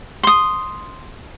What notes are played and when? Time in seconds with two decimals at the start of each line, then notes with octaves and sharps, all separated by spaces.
0.23 C6 D#6